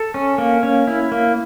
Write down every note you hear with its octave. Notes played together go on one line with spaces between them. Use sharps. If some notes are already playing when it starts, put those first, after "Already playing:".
Already playing: A4
C#4
A#3
C#4
E4
A#3